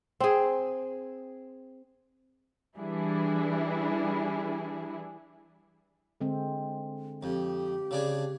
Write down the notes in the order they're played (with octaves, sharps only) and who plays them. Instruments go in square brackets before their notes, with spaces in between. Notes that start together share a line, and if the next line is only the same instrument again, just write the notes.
[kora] C4 G#4
[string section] E3 G3 D4 E4 G#4
[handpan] D3 G#3 C4
[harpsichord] F2 [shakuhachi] G4
[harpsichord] C#3 D4 G#4